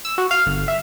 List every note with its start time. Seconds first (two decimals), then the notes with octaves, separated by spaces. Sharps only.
0.05 E6
0.18 F#4
0.31 F5
0.46 G1
0.68 E5